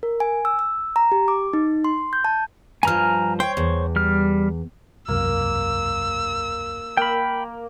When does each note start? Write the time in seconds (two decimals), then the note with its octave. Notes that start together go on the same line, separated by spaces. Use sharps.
0.03 A#4
0.20 G#5
0.45 E6
0.59 E6
0.96 A#5
1.12 G4
1.28 D6
1.53 D#4
1.84 C6
2.13 G6
2.25 A5
2.83 G2 F3 G#5 A#5 F6
3.40 C5 C#5 G5
3.57 E2
3.96 G3 F6
5.08 E1 C2 F#2 A#3 E6
6.97 A#3 G5 B5